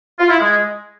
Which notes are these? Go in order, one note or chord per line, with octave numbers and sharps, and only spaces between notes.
F4
E4
G#3